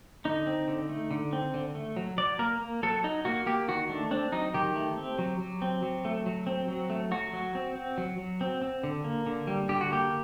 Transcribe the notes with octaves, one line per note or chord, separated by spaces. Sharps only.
D3 D#4
C4
D3
A3
D3
C4
D3
A3
F#3
F#3 D5
A#3 A#4
A#3
F#3 A4
F#3 D#4
A#3 F#4
A#3 G4
D#3 F#4
A3 D4
C4 D4
F#3 D#4
D#3 G4
A3
C4
F#3
F#3
C4
F#3
A3
F#3
C4
F#3
A3
F#3 F#4
F#3
C4
C4
F#3
F#3
C4
C4
D3
A#3
D3
G3
D3 G4
F#4
A#3 G4